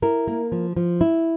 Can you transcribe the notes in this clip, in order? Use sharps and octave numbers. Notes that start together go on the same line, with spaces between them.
E4 A#4
A#3
F3
F3
E4